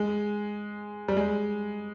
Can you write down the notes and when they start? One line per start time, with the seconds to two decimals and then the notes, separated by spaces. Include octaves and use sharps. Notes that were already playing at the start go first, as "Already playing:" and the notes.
Already playing: G#3
1.08 G3
1.17 G#3